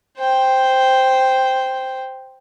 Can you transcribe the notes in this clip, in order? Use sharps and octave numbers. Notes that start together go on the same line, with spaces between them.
C5 G5